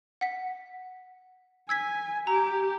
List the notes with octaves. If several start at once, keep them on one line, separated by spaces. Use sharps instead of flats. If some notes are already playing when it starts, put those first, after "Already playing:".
F#5 B6
G#5 E6 G#6 B6
G4 A#5